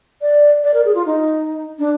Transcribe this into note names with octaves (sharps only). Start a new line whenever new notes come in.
D5
D5
A#4
G#4
F4
D#4
D4